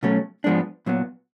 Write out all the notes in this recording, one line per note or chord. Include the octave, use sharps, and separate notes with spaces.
B2 F#3 A3 C#4
G#2 F3 G#3 B3 D4
A#2 F#3 B3